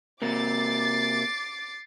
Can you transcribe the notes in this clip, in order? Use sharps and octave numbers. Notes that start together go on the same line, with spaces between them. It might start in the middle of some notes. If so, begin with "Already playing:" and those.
C3 A#3 D6 A6 C7